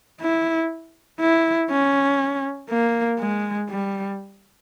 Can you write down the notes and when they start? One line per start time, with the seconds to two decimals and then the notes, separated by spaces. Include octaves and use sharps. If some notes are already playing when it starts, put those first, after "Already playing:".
0.20 E4
1.20 E4
1.70 C#4
2.70 A#3
3.20 G#3
3.70 G3